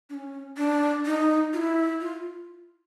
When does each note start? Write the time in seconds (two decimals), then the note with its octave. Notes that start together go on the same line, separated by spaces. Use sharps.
0.10 D4
0.14 C#4
0.57 D4
1.06 D#4
1.53 F4
1.57 E4
2.01 F4